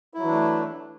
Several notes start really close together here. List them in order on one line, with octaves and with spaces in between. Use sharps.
E4 F#3 E3 D4 A3